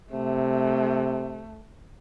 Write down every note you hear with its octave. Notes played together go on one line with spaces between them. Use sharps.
C3 A3